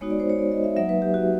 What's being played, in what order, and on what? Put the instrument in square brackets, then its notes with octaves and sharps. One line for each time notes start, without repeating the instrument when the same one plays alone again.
[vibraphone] G#3 B3 D#4 F#4 C#5
D5
C5
C#5
D5
D#5
E5
F#3 A#3 D#4 E5
B4
G4
F#4